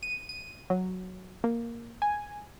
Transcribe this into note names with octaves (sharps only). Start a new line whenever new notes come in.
D#7
D#7
F#3
A#3
G#5